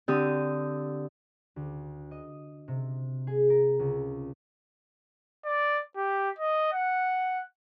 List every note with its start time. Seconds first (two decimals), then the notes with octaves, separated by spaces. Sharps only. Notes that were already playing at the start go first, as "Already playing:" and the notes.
0.08 D3 C4 G4 D#6
1.56 D2
2.11 D#5
2.68 C3
3.27 G#4
3.50 A#4
3.79 C#2
5.45 D5
5.97 G4
6.39 D#5
6.73 F#5